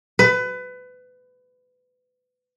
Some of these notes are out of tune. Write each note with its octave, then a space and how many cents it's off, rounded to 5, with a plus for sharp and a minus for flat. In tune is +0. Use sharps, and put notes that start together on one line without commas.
B4 +25